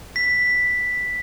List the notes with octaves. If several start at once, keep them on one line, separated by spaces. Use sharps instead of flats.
B6